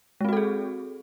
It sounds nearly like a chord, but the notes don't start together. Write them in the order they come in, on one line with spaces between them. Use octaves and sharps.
G#3 C4 F#4 A4 G#4